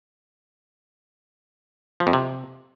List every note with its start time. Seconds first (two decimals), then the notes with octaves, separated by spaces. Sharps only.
2.00 F3
2.07 F2
2.13 C3